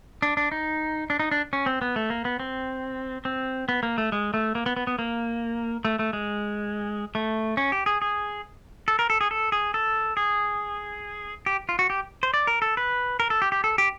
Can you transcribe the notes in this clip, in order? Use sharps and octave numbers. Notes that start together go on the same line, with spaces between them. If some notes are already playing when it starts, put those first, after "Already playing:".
D4
D4
D#4
D4
D#4
D4
C#4
C4
B3
A3
A#3
B3
C4
C4
B3
A#3
A3
G#3
A3
A#3
B3
B3
B3
A#3
A3
A3
G#3
A3
C#4
G4
G#4
G#4
A4
A#4
A4
G#4
A4
G#4
A4
G#4
G4
F4
F#4
G4
C5
D5
A#4
A4
B4
A#4
A4
G4
G4
A4
G4